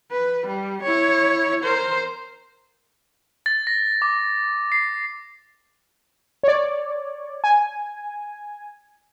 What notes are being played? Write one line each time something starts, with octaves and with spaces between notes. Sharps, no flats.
B4
G3
E4 C#5
A#4 C5
A6
A#6
D6
C7
C#5 D5
G#5